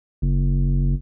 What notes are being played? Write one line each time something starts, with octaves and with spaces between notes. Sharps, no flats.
F#1